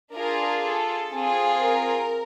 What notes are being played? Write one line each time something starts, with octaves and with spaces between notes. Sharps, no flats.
D4 F4 G#4 A#4
A4
C4 F4 G#4
A#4